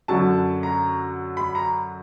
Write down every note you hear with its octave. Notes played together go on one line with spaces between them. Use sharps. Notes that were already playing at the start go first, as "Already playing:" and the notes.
F#2 D3 F#3 A5
A#5
B5
A#5